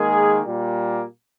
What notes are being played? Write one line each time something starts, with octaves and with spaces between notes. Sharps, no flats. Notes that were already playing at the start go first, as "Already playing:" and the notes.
Already playing: D#3 G#3 A#3 G#4
A#2 G3 A#3